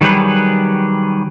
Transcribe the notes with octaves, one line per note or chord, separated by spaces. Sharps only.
D#3 F#3 G3 G#4 B4